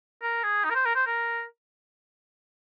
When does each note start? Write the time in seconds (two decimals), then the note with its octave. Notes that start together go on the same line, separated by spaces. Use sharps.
0.22 A#4
0.43 G#4
0.64 D#4
0.70 A#4
0.75 C5
0.85 A#4
0.95 C5
1.07 A#4